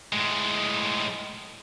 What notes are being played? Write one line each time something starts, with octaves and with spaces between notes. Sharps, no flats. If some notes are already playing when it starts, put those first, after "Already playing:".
A2 G#3